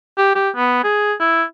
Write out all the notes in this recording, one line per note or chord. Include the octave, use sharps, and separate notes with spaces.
G4
G4
B3
G#4
E4